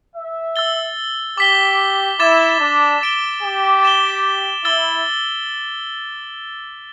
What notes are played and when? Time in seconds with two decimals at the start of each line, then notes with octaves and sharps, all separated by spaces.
0.15 E5
0.56 E6 A6 G7
1.37 G4 D6 B6 G7
2.19 E4 D6 A6 E7
2.60 D4
3.01 A6 D7 G7
3.42 G4
3.83 A6 E7 G7
4.65 E4 E6 A6 G7